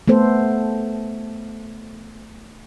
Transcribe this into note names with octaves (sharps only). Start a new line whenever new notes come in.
A3 B3 A4 C5